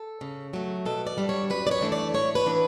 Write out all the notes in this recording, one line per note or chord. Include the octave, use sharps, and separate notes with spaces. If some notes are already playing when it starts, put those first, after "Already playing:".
Already playing: A4
C#3
F#3 A3
B2 A4
D5
G3 D4
C#5
F#2 B4
D5
C#5
E3 A3 D4
D5
A2 C#5
B4
E3 B3 D4